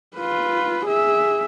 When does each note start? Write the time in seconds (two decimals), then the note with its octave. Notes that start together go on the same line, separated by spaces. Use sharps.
0.17 F4 B4
0.86 G#4 E5